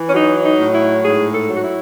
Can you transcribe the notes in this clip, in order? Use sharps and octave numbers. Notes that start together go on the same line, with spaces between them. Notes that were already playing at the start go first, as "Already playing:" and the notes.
Already playing: E3
C#4
F#3 D#4
D#4
A2
E4
G#2 G#4
A4
F#3
F#4
E4